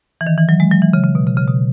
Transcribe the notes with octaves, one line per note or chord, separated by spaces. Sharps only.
E3
D#3
E3
F#3
G#3
F#3
E3
C#3
C#3
B2
C#3
C#3
B2